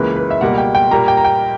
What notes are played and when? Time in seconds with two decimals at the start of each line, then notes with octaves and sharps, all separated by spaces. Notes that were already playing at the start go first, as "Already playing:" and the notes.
Already playing: C#2 C#3 E3 A#3 B4
0.16 B4
0.31 E5
0.41 C#2 B2 G3 A#3 F#5
0.58 G5
0.75 G5
0.91 A#2 G3 A#3 A#5
1.08 G5
1.17 A#5
1.25 G5